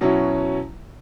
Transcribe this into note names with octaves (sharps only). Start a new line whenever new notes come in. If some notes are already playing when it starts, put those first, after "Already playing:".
B2 F#3 C#4 E4